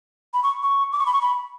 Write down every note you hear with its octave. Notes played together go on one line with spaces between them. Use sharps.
B5
C#6
C#6
D6
C#6
B5
C#6
B5